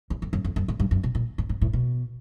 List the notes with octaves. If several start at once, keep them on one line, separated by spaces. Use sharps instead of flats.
E2
F2
F#2
F2
F#2
G#2
G2
F#2
B2
A#2
G#2
G#2
A2
B2